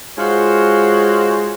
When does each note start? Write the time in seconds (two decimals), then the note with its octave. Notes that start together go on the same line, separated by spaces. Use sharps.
0.17 G#3 F4 F#4 C5 C#5